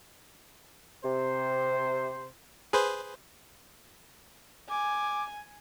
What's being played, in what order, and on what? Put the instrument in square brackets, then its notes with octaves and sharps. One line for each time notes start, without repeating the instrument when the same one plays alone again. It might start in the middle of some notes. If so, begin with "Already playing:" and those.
[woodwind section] C3 [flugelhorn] C5
[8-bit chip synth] G#4 B4 C5
[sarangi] G#5 [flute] D6